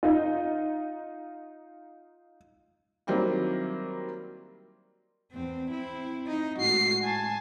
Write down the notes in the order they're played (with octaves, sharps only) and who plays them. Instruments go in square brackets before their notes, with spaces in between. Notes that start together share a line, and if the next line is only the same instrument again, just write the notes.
[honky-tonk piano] D#4 F4
[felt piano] D#3 F#3 G3 A#3 C4 E4
[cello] E2 C4
C4 E4
D#4
[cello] A2 G#3 [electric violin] F#4 C7
[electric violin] G#5 A5